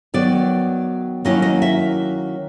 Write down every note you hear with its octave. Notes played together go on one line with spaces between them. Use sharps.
D#3 F#3 B3 D5
D#3 F#3 A#3 C#4 E4 D#5
D#5
E5